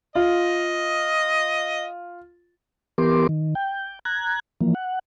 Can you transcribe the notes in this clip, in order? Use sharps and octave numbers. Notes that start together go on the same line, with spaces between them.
F4 D#5
E3 B3 G4 A#4 C6 D6
D#3
G5
A#5 F#6 G#6
E3 F3 A#3
F#5